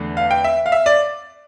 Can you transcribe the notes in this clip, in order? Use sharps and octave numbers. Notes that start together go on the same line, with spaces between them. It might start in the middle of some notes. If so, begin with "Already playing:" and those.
Already playing: E2 D3 A3
F5
G5
E5
F5
E5
D5